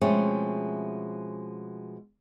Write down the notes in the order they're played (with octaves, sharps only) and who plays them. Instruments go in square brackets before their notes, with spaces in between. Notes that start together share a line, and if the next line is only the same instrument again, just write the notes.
[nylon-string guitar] B2 F3 G#3 A3 C4 C#4